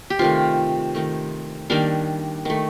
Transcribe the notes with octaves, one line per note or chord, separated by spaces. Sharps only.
G4
C3 D#3 A3 F4
D#3 A3
D#3 G3 A#3 D4
D#3 A3